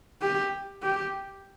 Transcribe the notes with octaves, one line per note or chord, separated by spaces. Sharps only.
G4
G4